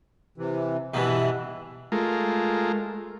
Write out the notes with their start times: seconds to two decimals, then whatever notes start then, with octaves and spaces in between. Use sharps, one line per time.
0.38 C3 E3
0.94 G2 B2 E3 E5
1.92 G#3 A3 F4 A#4